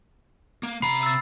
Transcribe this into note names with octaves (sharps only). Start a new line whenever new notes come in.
A#3
C3 A#5 B5 C7
E6 A6